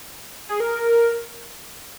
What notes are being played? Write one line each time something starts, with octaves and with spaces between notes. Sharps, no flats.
G#4
A#4